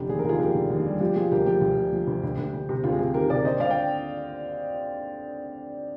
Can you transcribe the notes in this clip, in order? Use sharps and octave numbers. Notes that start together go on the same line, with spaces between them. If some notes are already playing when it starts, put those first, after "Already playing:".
Already playing: F1 D3 G4
D#2 G#4
A#4
D#2 F4 G#4
F1 G4 A#4
D3
D#2
G3
F3 G4
F3 F4 G#4
D2 G4 A#4
F3 G4
D2
F3
F3
D2
D2
D2
D2
C3
D2 F4
G#4
C3 G4
D#3 G4 A#4
C3 A#4 D5
D3 C5 D#5
D3 D5 F5
G5